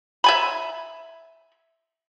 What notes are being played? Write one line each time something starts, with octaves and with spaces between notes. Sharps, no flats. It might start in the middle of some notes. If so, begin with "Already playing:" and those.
E5 G#5 B5